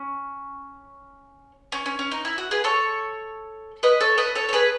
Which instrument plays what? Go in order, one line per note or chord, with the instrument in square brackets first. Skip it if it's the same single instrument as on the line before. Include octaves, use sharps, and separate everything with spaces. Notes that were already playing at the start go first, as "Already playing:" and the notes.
Already playing: [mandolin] C#4
C#4
C#4
C#4
D#4
E4
F#4
G#4 B4
A4 C#5
B4 D#5
A4 C#5
B4 D#5
A4 C#5
C#5
G#4 B4